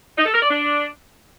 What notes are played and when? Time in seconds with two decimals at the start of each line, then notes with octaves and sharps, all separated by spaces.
0.17 D#4
0.26 A4
0.34 A#4
0.42 D5
0.50 D4